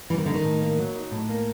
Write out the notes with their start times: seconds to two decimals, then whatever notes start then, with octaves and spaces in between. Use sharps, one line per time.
0.10 E3 G3
0.18 D#3
0.26 D3 D#4
0.34 D#3
0.44 A2
0.61 A#3
0.79 F#3
0.95 D#4
1.11 A2
1.29 A#3